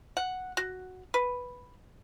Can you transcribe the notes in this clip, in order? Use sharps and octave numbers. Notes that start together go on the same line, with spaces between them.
F#5
F#4
B4